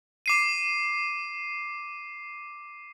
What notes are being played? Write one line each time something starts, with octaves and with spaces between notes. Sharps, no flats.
D6 C7 D#7